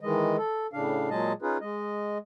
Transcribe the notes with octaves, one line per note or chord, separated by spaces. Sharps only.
D#3 E3 G#3 D#5
A4
A2 C#3 D4 F5
A#2 F#3 G#3 G#4 D#5 A5
C#4 D#4 F4 G#4 B4
G#3 D#5